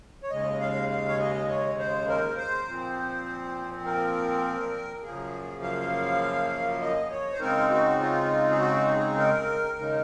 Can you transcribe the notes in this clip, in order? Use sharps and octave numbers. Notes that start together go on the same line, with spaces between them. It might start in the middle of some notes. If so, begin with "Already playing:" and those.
C#5
D#2 C#3 G#3 D#5
F5
F5
C#5
D#5
C#5
C5
A#4
C5
A#2 F3 C4
A#4
F#2 C#3 F3 A#3 G#4
F5
D#5
C#5
C5
C#3 G#3 C4 D#4 A#4
F#4
F4
G#4
F#4
G#4
A#4
D#2 C#3 G#3 D#4